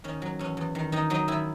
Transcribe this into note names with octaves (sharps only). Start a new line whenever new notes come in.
D#3 C#4
F#3
E2 C#4
E2
D#3
D#3 D#4
F#3 D#4
D#3 E4